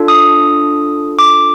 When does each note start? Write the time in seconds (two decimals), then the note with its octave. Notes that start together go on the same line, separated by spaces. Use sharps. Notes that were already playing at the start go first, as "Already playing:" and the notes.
Already playing: D4 F4 A4
0.08 D#6
1.19 D6